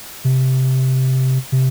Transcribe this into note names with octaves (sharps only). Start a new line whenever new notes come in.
C3
C3